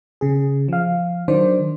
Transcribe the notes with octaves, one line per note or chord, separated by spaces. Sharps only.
C#3 G#4
F3 F5
D#3 F#3 D4 C5 D5